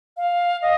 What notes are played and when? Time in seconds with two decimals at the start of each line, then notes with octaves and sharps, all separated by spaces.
0.17 F5
0.62 D#5